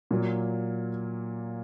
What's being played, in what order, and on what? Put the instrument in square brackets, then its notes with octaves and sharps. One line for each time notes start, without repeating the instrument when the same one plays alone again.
[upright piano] A#2 F#3 A#3